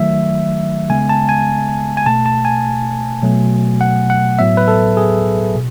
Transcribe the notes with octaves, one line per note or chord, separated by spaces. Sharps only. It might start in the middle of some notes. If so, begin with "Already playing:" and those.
Already playing: D#3 F#3 A3 E5
C#3 G#3 B3 G#5
A5
G#5
G#5
B2 A3 A5
A5
G#5
B2 F#3 A3
F#5
F#5
A2 F#3 B3 E5
B4
A4
G#4
B2